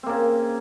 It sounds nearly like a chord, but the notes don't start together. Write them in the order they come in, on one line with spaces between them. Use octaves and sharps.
C4 A#3 C#3